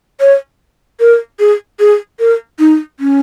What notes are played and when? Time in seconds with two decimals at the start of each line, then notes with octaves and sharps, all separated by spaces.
0.20 C#5
1.00 A#4
1.40 G#4
1.80 G#4
2.20 A#4
2.59 D#4
3.00 C#4